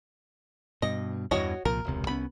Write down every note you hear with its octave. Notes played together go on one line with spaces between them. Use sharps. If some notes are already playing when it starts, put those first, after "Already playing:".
G2 B2 D#5
E2 G2 E3 F#4 C#5 D#5
C2 A#2 F3 A#4
E1 C#2 C3
C2 B3 C#4 B5